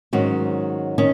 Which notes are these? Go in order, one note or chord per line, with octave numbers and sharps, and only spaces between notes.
G#2 D#3 F#3 C#4 F#4
D#3 C#4